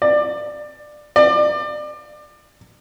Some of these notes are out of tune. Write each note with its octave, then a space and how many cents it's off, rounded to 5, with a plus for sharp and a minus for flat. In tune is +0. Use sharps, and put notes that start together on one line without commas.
D5 +20
D5 +30